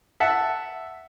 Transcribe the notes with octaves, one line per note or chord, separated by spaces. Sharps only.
E5 F#5 A5